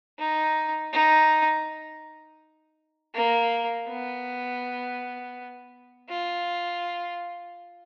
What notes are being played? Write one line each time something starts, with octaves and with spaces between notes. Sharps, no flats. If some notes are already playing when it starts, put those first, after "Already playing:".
D#4
D#4
A#3
B3
F4